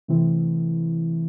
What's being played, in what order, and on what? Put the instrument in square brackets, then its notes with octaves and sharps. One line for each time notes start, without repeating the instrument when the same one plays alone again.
[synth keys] C3 E3 A3 C4 E4